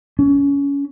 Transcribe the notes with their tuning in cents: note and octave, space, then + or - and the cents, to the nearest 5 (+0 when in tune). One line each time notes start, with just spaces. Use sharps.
C#4 +25